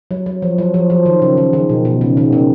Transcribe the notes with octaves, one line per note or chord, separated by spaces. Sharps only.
F#3
F#3
F3
F#3
F3
F3
D#3
C#3
D#3
D#3
B2
B2
C#3
D#3
C#3